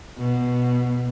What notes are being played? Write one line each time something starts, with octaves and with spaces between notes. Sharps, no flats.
B2